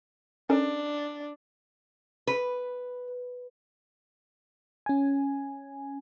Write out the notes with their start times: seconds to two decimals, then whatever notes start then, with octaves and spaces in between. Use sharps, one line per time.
0.50 C#4 D4 A4 A#4
2.27 B4
4.86 C#4 G#5